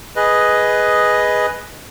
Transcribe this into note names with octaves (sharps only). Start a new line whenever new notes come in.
G#4 B4 D#5